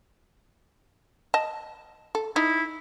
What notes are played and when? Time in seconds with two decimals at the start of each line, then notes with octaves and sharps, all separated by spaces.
1.34 D#5 A5
2.15 A4
2.36 D#4 E4